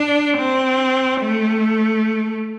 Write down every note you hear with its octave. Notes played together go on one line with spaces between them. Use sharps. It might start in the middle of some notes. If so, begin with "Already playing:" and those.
Already playing: D4
C4
A3